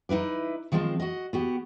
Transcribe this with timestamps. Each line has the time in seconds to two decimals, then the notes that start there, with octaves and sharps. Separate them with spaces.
0.09 D#4 E4 B4 D5
0.72 D#3 F3 G#3 A#3 C4
1.00 F#4 D#5
1.33 B3 F#4 G4